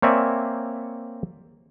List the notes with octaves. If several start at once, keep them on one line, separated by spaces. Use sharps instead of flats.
A#3 C4 C#5 D5 E5 G#5